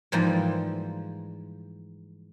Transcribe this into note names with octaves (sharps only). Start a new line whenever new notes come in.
G#2 E3 F3 G3 A#3 F4